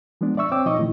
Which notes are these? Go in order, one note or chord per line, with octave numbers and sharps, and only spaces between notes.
F3 G#3 B3 D4
D5 E5 C#6 E6
C4 C#5 G5 D6 E6
A#2 F3 D#4 D#5 C#6
A#2 D#3 A3 E4